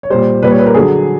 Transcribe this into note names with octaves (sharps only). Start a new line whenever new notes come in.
C#5
A#2 G3 C5
A#2 G3 B4
C#5
B4
A#4
D3 F#3 G#4